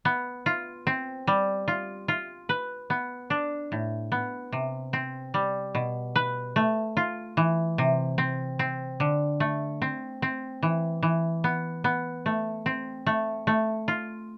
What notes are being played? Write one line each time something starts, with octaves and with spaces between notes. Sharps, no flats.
B3
F4
C4
G3
F4
F4
B4
B3
D4
A2
B3
C3
C4
G3
B2
B4
A3
F4
E3
C3
C4
C4
D3
A3
C4
C4
E3
E3
B3
B3
A3
C4
A3
A3
F4